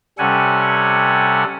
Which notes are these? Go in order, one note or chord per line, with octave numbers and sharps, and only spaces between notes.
C3 G3 C#4 A4 F#5 G#5